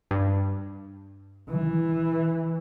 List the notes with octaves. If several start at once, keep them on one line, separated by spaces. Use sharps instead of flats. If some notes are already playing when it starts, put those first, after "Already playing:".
G2
E3